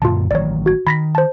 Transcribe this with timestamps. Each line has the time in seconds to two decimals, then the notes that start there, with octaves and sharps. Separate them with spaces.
0.02 F#2 A#2 D3 F4 A5
0.31 A1 D#3 F#3 C#5 D5
0.66 F#4 G#6
0.87 D#3 B5 A#6 B6
1.15 C5 A5